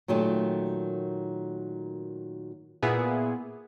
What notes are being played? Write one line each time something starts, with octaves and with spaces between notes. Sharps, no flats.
A#2 D#3 F#3 A3 G4
A#2 B3 E4 G#4